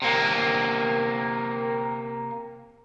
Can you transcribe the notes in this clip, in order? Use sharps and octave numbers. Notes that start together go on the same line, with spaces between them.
C3 A#3